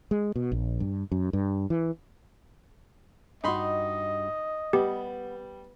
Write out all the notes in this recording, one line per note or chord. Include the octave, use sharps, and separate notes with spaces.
G#3
B2
A#1
G2
F#2
G2
E3
G2 D#4 F#4 D#5 B5 C6
G3 B3 G4